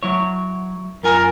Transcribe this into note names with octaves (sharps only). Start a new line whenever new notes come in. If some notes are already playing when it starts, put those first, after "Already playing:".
F#3 E4 C#5
F#2 F4 A#4 G#5